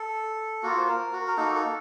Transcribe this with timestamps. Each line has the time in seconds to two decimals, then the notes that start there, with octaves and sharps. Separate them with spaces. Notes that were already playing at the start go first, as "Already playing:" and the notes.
Already playing: A4
0.63 A#3 F4 F#4
0.77 C5
0.88 A#4
1.13 F#4
1.27 A#4
1.37 A#3 D#4 F#4 A4
1.55 A4